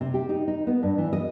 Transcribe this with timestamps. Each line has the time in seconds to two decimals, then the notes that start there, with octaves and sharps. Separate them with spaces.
0.01 C3
0.14 G4
0.29 D#4
0.48 D#4
0.67 B3
0.83 G2
0.98 E3
1.13 D#5